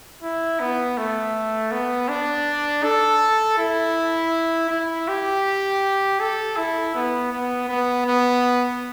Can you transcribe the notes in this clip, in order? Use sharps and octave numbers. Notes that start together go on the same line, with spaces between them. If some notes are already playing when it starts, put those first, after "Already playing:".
E4
B3
A3
B3
D4
A4
E4
E4
G4
A4
E4
B3
B3
B3
B3